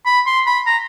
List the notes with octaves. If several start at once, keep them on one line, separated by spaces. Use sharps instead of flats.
B5
C6
B5
A#5